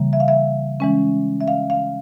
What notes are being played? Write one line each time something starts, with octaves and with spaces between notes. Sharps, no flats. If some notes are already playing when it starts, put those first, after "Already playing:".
Already playing: C#3 E3 G3 A#3
E5
F5
E5
E3 G#3 C#4
E5
F5
F5